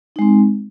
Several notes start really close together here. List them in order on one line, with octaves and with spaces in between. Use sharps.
D#4 G#3 C4